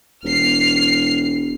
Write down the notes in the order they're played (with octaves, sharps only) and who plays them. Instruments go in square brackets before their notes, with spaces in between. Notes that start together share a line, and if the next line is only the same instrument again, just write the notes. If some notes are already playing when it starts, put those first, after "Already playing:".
[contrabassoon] E1 [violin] F6 C7